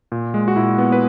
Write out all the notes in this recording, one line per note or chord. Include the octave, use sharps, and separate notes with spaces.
A#2
G#3
F#4
A#2 E4
B3
B4